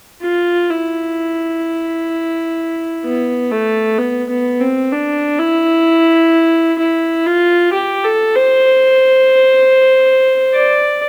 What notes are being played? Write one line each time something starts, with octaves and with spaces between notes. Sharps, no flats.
F4
E4
B3
A3
B3
B3
C4
D4
E4
E4
F4
G4
A4
C5
D5